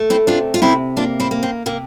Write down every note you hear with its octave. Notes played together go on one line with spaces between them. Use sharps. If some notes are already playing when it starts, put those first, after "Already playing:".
Already playing: A3
C4 E4
C3 D4 F4
F4
C3 C4 E4
A#3 D4 F4
C4 E4
A#3
C4
C3 A#3